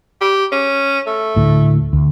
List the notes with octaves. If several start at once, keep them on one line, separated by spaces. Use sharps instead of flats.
G4
C#4
A3
D2 A2
D2